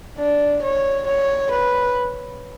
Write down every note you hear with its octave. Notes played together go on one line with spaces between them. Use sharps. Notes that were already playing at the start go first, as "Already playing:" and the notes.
D4
C#5
C#5
B4